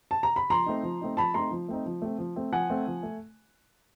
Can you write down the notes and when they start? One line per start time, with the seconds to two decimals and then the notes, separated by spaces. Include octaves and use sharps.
0.11 A5
0.23 A#5
0.36 B5
0.50 F3 A#5 C6
0.66 A3 C4 D#4
0.83 F3
1.01 A3 C4 D#4
1.17 F3 A5 B5
1.34 A3 C4 D#4 A#5 C6
1.51 F3
1.68 A3 C4 D#4
1.86 F3
2.02 A3 C4
2.19 F3
2.36 A3 C4
2.52 F3 F#5 G#5
2.69 A3 C4
2.87 F3
3.03 A3